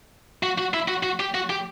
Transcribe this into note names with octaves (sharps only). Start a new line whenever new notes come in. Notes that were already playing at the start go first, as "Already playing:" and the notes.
F#4
F#4
E4
F#4
F#4
G4
F#4
G4